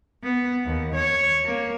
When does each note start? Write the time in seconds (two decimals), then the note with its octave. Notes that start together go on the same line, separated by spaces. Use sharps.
0.22 B3
0.66 D#2
0.95 C#5
1.44 A#3